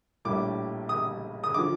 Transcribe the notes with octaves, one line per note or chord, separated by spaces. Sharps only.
A#1 A2 G3 D6
D#6
D#6
D3 F3 D6